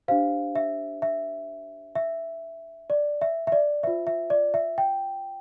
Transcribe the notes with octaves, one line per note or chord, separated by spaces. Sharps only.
D4 G4 C5 F5
E5
E5
E5
D5
E5
E5
D5
F4 C5 E5
E5
D5
E5
G5